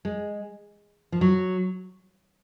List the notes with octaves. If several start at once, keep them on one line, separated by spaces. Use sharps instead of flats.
G#3
F3
F#3